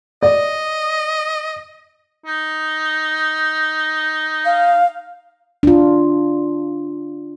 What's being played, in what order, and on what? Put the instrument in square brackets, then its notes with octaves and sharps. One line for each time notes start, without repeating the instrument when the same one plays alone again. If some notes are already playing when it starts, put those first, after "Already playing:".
[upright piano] D5 [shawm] D#5
[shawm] D#4
[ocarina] F5
[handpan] D4 F4